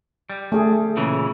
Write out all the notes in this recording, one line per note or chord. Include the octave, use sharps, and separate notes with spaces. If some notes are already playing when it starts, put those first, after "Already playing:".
G3
A3 G#4
A#2 C#3 E3